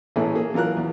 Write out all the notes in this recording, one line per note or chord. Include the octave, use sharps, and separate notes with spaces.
A1 E3 A3 C#4 G#4
A#3 G#4
E3 F#3 F4 A#4 F#6
E2